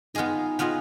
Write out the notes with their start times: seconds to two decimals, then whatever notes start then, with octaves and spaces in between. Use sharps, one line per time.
0.14 B3 D#4 F4 G#4 D#5
0.59 B3 F4 G#4 D#5